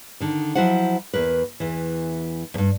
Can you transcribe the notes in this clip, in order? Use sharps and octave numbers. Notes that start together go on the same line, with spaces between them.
D3 D#3
F3 F#3 E4 C5 F#5
E2 A#4 B4
E2 E3
E2 G2